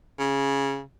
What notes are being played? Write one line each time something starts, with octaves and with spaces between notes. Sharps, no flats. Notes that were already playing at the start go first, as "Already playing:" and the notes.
C#3